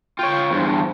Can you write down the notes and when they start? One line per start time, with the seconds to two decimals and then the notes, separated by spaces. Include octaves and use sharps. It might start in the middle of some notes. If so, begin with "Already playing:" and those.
0.19 F4 C#5 G5
0.51 E2 G2 C5